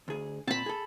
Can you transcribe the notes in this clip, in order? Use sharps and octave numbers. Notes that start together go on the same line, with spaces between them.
D2 G#4
A#2 C4 A5 B5
G#4 A4